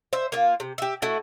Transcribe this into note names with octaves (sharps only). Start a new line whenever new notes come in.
C5 E5
A#3 F4
C3
G4 E5
A3 E4 F#4